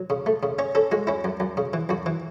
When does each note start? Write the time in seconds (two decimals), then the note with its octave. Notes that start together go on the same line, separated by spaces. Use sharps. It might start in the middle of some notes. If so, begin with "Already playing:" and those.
Already playing: F#3
0.10 C#3
0.26 A3
0.43 C#3
0.59 C#4 C#5
0.75 C#4 A4
0.92 G#3 F#4
1.07 C#4 E4
1.24 F#2
1.40 F#2
1.57 C#3
1.73 E3
1.89 F#2 F#4
2.06 E3